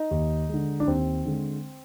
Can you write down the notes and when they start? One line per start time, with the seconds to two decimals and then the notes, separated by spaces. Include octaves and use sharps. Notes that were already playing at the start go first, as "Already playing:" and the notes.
Already playing: D#4
0.11 D#2
0.49 D3 G#3
0.80 D4
0.87 D#2 C4
1.25 D3 G#3